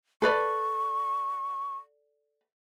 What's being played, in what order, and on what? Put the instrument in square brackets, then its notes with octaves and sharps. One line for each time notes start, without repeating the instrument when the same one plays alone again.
[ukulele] A4 B4 D5 [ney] C#6